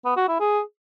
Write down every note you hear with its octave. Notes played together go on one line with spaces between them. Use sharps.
B3
F#4
E4
G#4